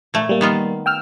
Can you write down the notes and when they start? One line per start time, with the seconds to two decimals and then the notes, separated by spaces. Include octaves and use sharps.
0.14 A#2 A3
0.29 G3 A#3
0.41 D#3 B3 F4
0.86 G5 E6 F6